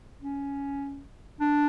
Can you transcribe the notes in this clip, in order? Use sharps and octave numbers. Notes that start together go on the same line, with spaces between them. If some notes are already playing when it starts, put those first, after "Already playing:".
C#4
D4